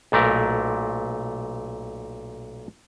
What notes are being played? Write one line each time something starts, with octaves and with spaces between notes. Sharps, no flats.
B1 A#2 A3 A#4